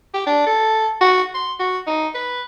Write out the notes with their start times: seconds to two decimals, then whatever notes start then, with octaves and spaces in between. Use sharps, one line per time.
0.14 G4
0.27 D4
0.47 A4
1.01 F#4
1.34 C6
1.60 F#4
1.87 D#4
2.15 B4